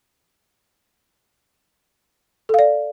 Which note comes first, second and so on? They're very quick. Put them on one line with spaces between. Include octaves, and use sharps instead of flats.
A4 F5 D5